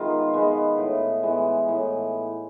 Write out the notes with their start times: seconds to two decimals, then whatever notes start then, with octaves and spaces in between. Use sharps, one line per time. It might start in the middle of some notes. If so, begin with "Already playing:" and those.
Already playing: D#3 G#3 B3 F4
0.34 G#3 B3
0.78 A2
1.23 E3 G#3 B3
1.69 A2